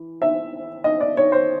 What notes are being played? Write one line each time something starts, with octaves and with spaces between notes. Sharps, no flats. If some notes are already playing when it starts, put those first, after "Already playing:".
Already playing: E3
E5
D#5
D5
C#5
C5